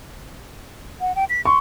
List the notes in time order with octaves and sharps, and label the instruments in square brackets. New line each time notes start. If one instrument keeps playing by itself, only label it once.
[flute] F#5
G5
B6
[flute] C6 [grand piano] C#6